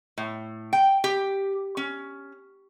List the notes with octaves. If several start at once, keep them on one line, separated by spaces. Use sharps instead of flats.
A2
G5
G4
C#4